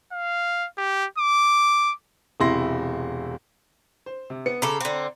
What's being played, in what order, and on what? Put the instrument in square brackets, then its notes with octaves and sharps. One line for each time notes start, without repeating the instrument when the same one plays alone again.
[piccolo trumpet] F5
G4
D6
[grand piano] E1 C3 E4 C6 A#6
[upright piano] C5
C3
B3 C#7
[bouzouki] C#3 A4 [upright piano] A#5 B5 D6
[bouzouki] D3 C4